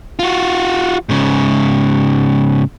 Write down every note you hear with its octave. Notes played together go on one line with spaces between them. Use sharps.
F4 F#4
G#2 C#3